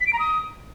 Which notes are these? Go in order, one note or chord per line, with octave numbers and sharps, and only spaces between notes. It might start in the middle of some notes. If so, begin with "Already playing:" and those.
B6
D7
A#5
D#6